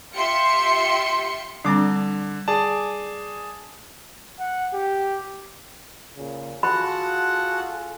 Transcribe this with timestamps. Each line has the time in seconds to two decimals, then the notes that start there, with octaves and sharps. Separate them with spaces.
0.15 F4 G4 E5 C6 C#7
1.65 D3 G3 C4 D4 D6
2.48 G#4 D5 A5
4.39 F#5
4.73 G4
6.16 A#2 C#3
6.63 F4 F#4 G#4 A4 F#5 A5 B5